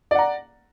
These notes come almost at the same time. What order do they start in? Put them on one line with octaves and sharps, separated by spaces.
D5 F#5 A#5